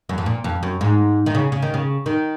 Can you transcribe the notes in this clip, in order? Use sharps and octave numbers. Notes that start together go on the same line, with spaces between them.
F#2
F2
A#2
F2
F#2
G#2
D#3
C#3
C#3
D#3
C#3
D#3